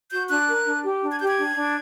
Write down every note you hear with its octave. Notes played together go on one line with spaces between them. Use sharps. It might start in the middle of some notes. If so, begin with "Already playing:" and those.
F#4 G6
D4 F#6
A#4
D4
G4
D4
G#6
G4 G6
G#6
D4
D4